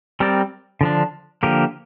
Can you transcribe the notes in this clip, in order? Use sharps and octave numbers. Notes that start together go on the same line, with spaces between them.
G3 C4 A#4 D5
D3 F3 D4
D3 F3 A#3 G4 A#4